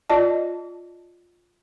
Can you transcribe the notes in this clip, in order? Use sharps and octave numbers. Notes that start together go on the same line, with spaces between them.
F4 D5 D#5 A5